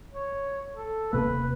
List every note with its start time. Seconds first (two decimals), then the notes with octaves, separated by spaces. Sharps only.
0.12 C#5
0.73 A4
1.13 D#1 C3 A#3 B4